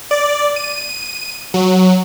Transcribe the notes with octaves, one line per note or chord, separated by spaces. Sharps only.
D5
D#7
F#3